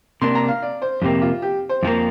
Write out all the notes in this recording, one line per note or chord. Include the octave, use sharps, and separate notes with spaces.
C3 A#3 D4 C6
A#5
F5
D5
C5
F2 C3 A#3 G4
F4
G4
C5
F2 F3 A#3